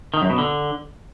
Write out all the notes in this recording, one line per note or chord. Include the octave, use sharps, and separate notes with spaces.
D#3
F#2
B2
D3